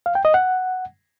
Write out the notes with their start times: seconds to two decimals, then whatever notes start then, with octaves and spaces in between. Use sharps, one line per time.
0.06 F5
0.15 G5
0.25 D#5
0.34 F#5